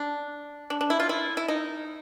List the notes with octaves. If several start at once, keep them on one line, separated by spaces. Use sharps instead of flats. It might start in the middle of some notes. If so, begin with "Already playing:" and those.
Already playing: D4
D4
D4
E4
F4
E4
E4
D#4